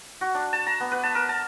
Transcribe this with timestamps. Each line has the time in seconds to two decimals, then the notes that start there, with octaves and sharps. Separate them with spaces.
0.21 F#4
0.35 D4
0.53 A5
0.67 A#5
0.80 B3
0.92 B4
1.03 A5
1.15 A#4
1.29 A5